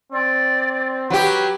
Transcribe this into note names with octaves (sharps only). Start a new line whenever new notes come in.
C4 D5
F#3 G4 B4